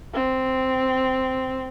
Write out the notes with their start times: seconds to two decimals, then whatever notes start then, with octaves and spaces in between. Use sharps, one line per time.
0.14 C4